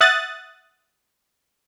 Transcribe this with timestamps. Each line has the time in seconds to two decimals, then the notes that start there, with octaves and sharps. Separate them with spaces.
0.01 E5 F#5 D#6 F#6 A6